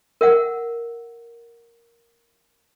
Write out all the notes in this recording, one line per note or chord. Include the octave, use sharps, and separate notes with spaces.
A#4 E5 F#5